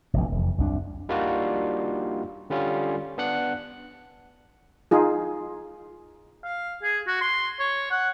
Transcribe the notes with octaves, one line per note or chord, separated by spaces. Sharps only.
F1 A#1
F1 E2
C2 F#2 D4
G3 A#3 D4 D#4 F4 F#4
D3 G3 C#4 F4
B3 D4 F#5 F#6
D#4 F4 G#4
F5
G#4
F#4
C6
C#5
F#5